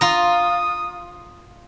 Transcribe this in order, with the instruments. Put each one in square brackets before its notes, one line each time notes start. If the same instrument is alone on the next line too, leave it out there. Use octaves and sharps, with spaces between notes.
[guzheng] F4 A#5 [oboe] D#6